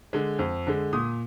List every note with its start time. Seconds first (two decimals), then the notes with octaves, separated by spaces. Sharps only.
0.13 D3 G#3
0.39 F2
0.67 D3 G#3
0.93 A#2 D#6